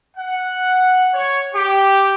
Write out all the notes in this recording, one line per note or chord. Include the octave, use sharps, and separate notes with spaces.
F#5
C#5
G4